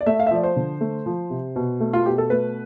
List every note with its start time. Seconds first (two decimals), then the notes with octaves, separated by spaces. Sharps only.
0.01 D5
0.06 A3 E5
0.20 F5
0.27 E5
0.31 F3 D5
0.43 C5
0.56 D3
0.81 A3
1.06 F3
1.30 C3
1.56 B2
1.80 A3
1.93 F4
2.06 B2 G4
2.18 A4
2.30 A3 B4